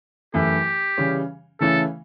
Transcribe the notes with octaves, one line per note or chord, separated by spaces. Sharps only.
F#2 E3 A3 E4 G4
C#3 E3 G3 C#4
C#3 E3 A3 C#4 E4 A4